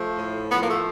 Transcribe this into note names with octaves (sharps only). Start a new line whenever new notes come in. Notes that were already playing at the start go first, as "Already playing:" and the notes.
Already playing: F3 A3
A2
F3 B3
A#3
A3